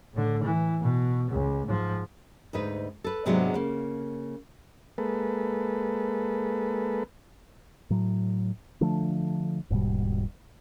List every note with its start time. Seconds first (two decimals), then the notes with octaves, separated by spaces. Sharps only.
0.13 A2 D3
0.43 E3
0.82 B2
1.31 C#2
1.67 G#2 F3
2.53 D2 G#2 D#4 B4
3.04 A4 B4
3.26 G#2 C3 F#3 G#3 B3 D4
3.54 C#3 A#3
4.98 G#3 A#3 A4 B4
7.90 A2 F#3
8.81 D3 F3 A3 D4
9.70 D#1 G#2 B2 G3